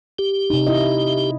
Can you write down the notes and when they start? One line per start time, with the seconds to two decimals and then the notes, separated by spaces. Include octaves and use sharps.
0.19 G4
0.50 C3 D#4
0.67 E4 D#5